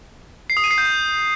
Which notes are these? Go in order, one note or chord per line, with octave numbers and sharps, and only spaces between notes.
C7
D#6
D#7
C7
G6